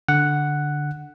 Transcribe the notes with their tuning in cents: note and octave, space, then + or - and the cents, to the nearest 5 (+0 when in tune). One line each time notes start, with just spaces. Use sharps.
D3 +0 F#5 +0